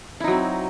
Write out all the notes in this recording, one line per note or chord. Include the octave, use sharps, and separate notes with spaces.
F#3 C4 D#4 E4